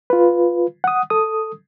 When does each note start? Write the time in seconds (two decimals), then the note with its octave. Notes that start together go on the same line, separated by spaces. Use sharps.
0.10 F4 B4
0.84 F#5 D#6
1.10 A4 D#6